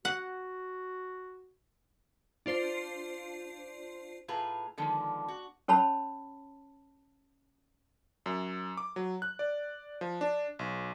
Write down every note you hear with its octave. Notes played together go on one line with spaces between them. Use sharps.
F#4 F#5
D4 F4 C5 C7
A2 F4 G#4 B4 A#5
D3 D#3 F3 G#3 B3
F#4
C#4 C#5 A5 B5
F#2
D6
F#3
F#6
D5
F3
D4
B1